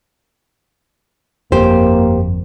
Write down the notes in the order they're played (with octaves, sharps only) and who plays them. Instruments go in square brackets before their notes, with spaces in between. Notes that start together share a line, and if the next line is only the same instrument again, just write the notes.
[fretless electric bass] G1 F2 [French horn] A#3 [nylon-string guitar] G4 C5